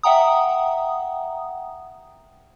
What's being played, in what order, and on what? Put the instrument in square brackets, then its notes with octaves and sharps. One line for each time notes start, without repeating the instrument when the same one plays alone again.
[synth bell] E5 F#5 G5 A#5 D#6